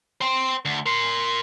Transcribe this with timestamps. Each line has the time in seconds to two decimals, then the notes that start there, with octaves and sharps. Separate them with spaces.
0.21 C5 G5
0.65 D2
0.86 A#4 C6